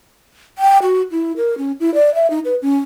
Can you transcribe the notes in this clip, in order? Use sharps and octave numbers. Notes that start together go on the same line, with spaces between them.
G5
F#4
E4
A#4
C#4
E4
D5
E5
D#4
B4
C#4